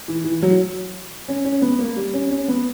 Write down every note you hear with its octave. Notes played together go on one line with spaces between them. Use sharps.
E3
E3
F#3
C#4
C#4
B3
A#3
G3
C#4
C#4
B3